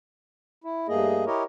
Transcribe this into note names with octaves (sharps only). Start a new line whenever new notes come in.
E4
G2 A3 A#3 G#4 D#5
E4 G4 A#4 C#5 D#5